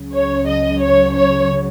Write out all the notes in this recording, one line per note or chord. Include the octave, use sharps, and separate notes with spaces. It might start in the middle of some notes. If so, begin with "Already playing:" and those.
Already playing: C#2 C#3 F#3
C#5
D#5
C#5
C#5